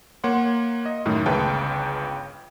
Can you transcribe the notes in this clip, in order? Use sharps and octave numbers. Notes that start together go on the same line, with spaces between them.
A#3 C#5 F#5 C6
D#5
F#2 A2 D#3 A3 D#4
G1 C#2 C#3 B4 G5 A5